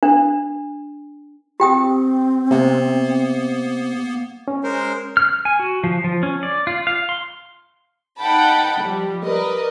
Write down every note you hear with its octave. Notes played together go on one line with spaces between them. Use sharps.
D4
C4 G4 G5 D#6
C3 A#3 B3
C#4
G#3 A#4 C5
F6
G#5
F#4
F3
F3
C#4
D5
F4
F5
C6
D#4 F#5 G5 A5 B5
F3 G3
A#4 B4 D5 D#5